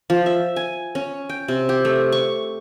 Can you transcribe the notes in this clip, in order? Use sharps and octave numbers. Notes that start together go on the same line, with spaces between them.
F3
E5
G#5
C#4
G5
C3
G4
A3
C#6